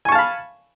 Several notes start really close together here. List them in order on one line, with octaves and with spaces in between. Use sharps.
G#5 C#6 A5 F5 B5